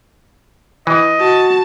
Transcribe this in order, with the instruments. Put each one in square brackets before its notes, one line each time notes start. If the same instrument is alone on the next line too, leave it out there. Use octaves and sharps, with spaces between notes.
[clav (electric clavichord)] E3 [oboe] D#5
[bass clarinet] F#4 [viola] A5